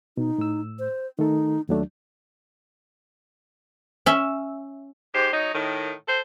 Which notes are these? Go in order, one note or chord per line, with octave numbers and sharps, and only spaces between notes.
B2 D#4
A2 E6
C5
D#3 A3 D#4 A4
D#2 F#3 A3 D4
C#4 E5
G#2 G4 C5
F#3 D#4
A2 D#3
A4 C5